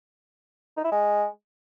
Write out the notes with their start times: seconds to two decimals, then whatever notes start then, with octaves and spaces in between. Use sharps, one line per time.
0.77 D#4
0.84 E4
0.92 G#3